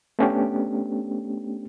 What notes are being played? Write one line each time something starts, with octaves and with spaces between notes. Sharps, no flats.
A3 B3 C#4 D4 G4